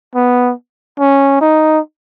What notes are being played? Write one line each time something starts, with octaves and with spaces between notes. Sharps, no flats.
B3
C#4
D#4